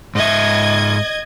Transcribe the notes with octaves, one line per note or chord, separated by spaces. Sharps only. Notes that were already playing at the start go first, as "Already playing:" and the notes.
G#2 D#5 E5 G#6